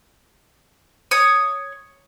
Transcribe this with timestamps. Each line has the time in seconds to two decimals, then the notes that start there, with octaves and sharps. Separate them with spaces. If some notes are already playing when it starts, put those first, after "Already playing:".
1.11 C#5 D#6